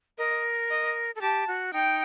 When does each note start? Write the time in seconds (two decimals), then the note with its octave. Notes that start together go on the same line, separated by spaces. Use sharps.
0.18 A#4 D#5
0.71 D#5
1.15 A4
1.21 G4 A5
1.48 F#4
1.73 D#4 G5